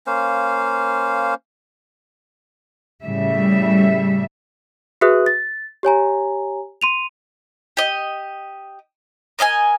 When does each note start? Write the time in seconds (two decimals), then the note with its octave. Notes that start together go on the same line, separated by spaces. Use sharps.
0.07 A#3 C#4 C5 F5
3.04 A2 C#3 G3 E5
5.01 F#4 G#4 B4 E5 D#6 F#6
5.26 A6
5.83 G4 C#5 G#5 A#5
6.81 C6 D#7 F7
7.77 G4 D#5
9.39 A#4 D#5 E5 G#5